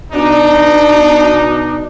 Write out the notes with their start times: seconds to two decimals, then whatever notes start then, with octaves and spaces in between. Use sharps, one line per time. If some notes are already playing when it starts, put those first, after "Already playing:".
0.12 B2 D4 D#4